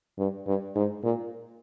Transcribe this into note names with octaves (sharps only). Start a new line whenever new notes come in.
G2
G2
G#2
A#2